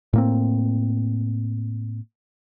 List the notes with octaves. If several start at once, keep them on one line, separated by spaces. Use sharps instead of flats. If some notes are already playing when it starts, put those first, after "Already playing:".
A2 A#3 C4